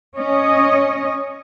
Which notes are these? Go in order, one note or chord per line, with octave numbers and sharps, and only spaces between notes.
C#4 C#5 D#5